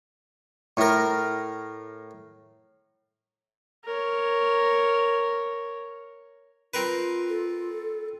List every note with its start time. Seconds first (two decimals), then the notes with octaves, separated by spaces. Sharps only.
0.77 A2 A#4
3.85 A#4 C#5
6.74 C4 F4 A#4 B4
7.29 A4